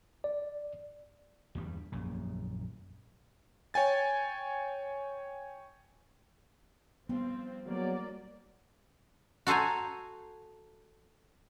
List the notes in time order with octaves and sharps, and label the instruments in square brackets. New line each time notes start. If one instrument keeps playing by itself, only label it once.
[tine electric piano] D5
[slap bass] E2 G2 G3
A#1 F#2 A#2
[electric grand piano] C#5 G5 G#5 A6
[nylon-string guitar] G2 F3 G3 [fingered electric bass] B3 [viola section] C4
[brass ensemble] E2 F#3 [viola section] A#3 D5
[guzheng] F#4 A4 C5 G#5 A#5